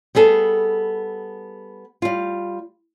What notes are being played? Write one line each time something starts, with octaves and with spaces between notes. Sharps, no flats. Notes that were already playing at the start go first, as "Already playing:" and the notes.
G3 B3 G#4 A4
G3 F4